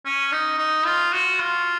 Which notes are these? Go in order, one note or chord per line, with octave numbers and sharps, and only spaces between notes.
C#4
D#4
D#4
F4
F#4
F4